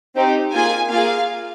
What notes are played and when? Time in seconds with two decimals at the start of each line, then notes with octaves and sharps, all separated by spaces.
0.16 C4 D#4 G4
0.53 A#3 F4 G#4 G#5
0.90 A#3 F4 G#4 F5